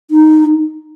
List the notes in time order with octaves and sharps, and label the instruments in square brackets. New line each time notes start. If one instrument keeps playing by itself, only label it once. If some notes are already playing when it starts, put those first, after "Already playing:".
[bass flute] D#4